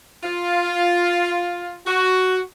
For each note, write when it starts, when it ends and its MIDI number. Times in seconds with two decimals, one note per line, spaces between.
0.23 1.76 65
1.87 2.41 66